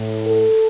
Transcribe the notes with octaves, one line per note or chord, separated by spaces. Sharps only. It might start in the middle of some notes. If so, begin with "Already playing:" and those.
Already playing: A2
A4